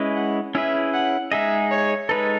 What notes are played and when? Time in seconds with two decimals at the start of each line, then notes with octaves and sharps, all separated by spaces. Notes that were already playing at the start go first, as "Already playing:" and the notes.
Already playing: G#3 C#4 E4 B4 D#5
0.16 F#5
0.55 C#4 E4 G#4 B4 E5
0.93 F#5
1.32 G#3 D#4 G#4 D#5 E5
1.71 C#5
2.09 G#3 D#4 A4 B4